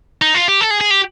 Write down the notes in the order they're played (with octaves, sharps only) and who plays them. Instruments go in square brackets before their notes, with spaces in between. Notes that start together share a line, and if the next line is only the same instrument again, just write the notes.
[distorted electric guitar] D#4
F4
G4
A4
G#4
G#4
G4